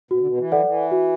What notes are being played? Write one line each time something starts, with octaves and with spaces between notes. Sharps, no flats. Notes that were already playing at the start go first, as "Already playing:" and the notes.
B2 F#4
D3
B2
E3
A4 D5 F#5
F#3
E3
F#4